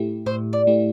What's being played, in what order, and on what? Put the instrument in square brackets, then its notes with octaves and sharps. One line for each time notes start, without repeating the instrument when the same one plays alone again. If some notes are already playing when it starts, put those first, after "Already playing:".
Already playing: [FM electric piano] A2 A3 E4 G4
[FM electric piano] A2 [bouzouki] C5
[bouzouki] D5
[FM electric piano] A3 E4 G4